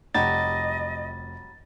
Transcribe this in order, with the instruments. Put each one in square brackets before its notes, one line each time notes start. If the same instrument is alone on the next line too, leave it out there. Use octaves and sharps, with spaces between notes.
[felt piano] F1 [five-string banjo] F#3 G3 F#4 [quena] D#5 [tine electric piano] A6